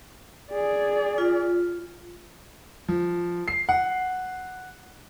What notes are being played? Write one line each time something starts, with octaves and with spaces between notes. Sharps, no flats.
G#4 D5
F4
F3
C7
F#5